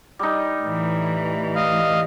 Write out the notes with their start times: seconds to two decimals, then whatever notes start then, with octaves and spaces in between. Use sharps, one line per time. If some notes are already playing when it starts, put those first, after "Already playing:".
0.19 G3 D#4
0.62 A2 E3
1.56 D#5 F5